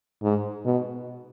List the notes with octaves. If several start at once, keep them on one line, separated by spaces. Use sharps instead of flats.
G#2
B2